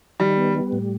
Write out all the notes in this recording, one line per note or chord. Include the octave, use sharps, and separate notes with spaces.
D#3 G3
B3
G3
A2